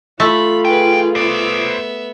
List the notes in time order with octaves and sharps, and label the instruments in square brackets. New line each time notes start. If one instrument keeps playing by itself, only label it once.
[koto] A3 [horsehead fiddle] F4 [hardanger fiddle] B5
[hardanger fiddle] G#4 B4 [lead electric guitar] G5
[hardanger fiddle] B3 E5 [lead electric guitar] C5 D5